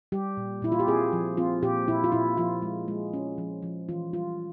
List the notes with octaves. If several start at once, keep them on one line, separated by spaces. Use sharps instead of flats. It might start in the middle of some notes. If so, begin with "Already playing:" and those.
G3 G4
A#2
A#2 E4
F4
G4
C4 G#4
F3
C4 F4
A#2 G4
A#2 E4
F4
A#2 E4
F3 F4
G#3
G#3
C#4
F3
F3
E3 F4
G3 F4